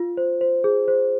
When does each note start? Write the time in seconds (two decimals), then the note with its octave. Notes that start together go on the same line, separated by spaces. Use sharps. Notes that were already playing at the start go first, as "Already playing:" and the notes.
Already playing: F4
0.17 C5
0.41 C5
0.64 G#4
0.88 C5